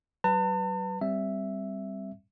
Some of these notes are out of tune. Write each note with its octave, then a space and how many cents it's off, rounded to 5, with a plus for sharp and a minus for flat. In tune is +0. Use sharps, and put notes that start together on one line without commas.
F#3 +35 B4 +10 A5 +45
G3 +0 C4 +0 E5 +0